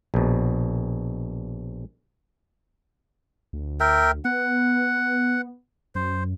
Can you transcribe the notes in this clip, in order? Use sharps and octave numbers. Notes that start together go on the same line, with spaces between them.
A#1 B2
D2
A#4 E5 G5
B3 F#5
F#2 C5